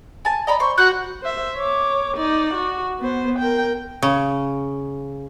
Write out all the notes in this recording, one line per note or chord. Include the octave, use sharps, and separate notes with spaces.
G#5 A5
D5 D#5 A#5 B5
C5 C#6
F#4 F#6 G6
C5 E5
C#5 D6
D#4 D5
F#4
B3 C5
A#4 G5
C#3